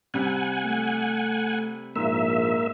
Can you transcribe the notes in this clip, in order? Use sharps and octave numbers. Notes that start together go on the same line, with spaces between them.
C3 G3 F#5 G#5
A3
A#1 G#2 A#3 E5